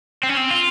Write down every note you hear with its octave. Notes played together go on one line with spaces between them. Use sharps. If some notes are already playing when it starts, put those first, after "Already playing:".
C4
C#4
C4
F4